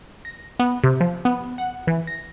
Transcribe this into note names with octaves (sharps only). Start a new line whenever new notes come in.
A#6
B3
C3
F3
B3
F#5
E3
A#6